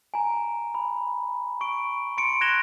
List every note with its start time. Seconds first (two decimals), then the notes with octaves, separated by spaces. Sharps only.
0.14 G#5 A#5
0.75 B5
1.61 C#6 D7
2.17 C6 C#7 D7
2.41 F#6 G#6 A#6 E7 F7 G7